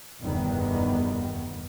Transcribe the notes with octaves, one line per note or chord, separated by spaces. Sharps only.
F1 E2 G2 D#3 G3 B3